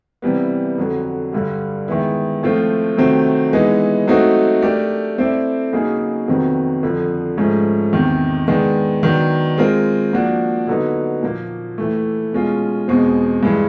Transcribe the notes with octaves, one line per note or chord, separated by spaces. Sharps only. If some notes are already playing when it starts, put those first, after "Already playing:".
C3 E3 G3 B3
F2 D3 F#3
G2 D3 G3
D#3 G#3 B3 E4
A2 F3 A3 C4 F4
C3 D#3 F#3 A3 C4
E3 G#3 B3 D#4
F#3 A3 C4 D#4 F#4
A3 D4 G4 A#4 D5
A3 C4 E4 A4 D5
C#3 F#3 A#3 D#4 G#4
F2 C3 D#3 F#3 B3
F2 D3 F3
G#2 F3 A3 C#4
E2 C3 D#3
D#3 G#3 B3 D4
D#3 F#3 B3 D4
G#3 C4 F4 A#4
F3 A#3 D4 F#4
D3 F#3 B3 D#4
A#2 F3 A#3
A2 E3 A3
B2 G#3 C#4 F4
E2 B2 G#3 C4
G2 E3 G#3